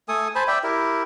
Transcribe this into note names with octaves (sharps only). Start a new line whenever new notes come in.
A3 A4 G#5 D#6
C5 G#5 A5 B5
D5 E5 G5
E4 G4 A#4 E5